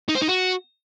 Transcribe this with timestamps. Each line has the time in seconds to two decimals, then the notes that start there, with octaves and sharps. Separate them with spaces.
0.09 D#4
0.15 C5
0.22 D#4
0.28 F#4